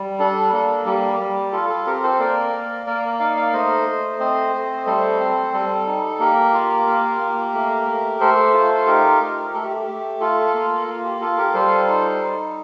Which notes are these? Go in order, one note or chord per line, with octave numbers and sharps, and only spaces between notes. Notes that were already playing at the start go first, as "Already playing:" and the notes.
Already playing: G3
D4 A4
A#3
G3 G4
G3
F4 A4
A4
C4 G4 A#4
A#4
A4 C5
A#3 A#4 D5
A#3
A#3 A#4 D5
D#4 D5 F5
D5 F5
A3 C5 D#5
A3
C4 C5 D#5
A3
G3 A4 C5
C4
G3 A4
D#4
A#3 G4 A#4
F4
A#3
A#3
A3
A3
A3 A4 C5
F4
D#4 G4 A#4
A3
A3 A4
G4
G4
A3
F4 A4
A#3
F4
G4
F4 A4
G4 A#4
G3 A4 C5
D#4
D#4